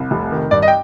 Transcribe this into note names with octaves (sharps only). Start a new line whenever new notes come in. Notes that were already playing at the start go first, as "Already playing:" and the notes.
Already playing: C2
F1
D#3
G2 D5
D#5
G5